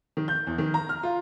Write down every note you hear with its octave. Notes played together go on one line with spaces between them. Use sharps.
D#3
G6
E2
D#3
A#5
F6
F4